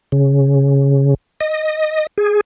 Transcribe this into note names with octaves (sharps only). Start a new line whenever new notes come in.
C#3
D#5
G#4